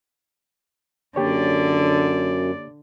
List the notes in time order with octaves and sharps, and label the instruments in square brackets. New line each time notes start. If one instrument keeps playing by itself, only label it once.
[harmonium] F#2 [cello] D3 [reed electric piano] A#3 G4 C#5 [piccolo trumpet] D5